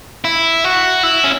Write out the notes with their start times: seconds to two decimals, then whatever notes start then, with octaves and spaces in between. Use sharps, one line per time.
0.25 E4
0.64 F#4
1.03 E4
1.24 C#4